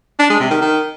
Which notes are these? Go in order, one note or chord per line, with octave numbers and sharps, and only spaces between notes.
D4
G#3
C3
D#3
D#3